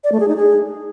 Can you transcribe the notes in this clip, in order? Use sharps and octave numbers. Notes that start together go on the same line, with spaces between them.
D5
A3
G#4
D#4
G#4